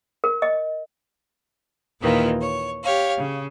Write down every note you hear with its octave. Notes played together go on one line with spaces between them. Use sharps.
A#4
D#5
D#2 A#2 D#3 E3 F4
C#5
G4 C#5 F5
C#3